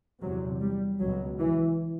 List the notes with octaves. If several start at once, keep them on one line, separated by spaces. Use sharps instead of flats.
E2 C3 F#3
G3
C#2 B2 F#3
E3